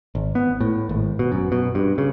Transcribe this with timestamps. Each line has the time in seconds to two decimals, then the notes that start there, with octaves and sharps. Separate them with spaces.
0.15 G#1
0.35 B3
0.60 A2
0.89 G#1
1.19 B2
1.32 F#2
1.52 B2
1.75 G2
1.98 C#3